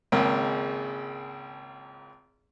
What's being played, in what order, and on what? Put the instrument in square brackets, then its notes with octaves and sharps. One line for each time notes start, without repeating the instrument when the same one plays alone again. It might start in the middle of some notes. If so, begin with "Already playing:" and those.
[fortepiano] G#1 C#2 A#3